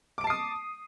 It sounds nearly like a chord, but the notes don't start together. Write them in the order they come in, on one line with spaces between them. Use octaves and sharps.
D6 D7 A5 C7 D#6